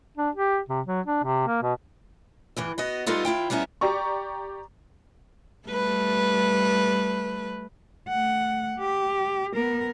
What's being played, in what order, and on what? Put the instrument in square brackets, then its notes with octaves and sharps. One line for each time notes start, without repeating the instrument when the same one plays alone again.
[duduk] D4
G4
C3
F#3
D4
C3
A#3
B2
[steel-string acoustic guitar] E2 G2 E3
B3 F#4 D#5
G3 G#3 B3 D#4 F4 A4
D#2 E4 F4 G5
G3 B3 C#4 D#4 E4
[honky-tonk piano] G4 D5 A#5 C#6
[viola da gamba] G3 A3 B4
[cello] A3 F#5
G4
B3 A#4